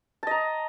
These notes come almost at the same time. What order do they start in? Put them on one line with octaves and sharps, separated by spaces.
A5 D#5 A#5